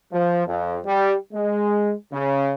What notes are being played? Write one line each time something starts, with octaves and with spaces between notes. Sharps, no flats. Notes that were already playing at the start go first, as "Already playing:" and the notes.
F3
F2
G3
G#3
C#3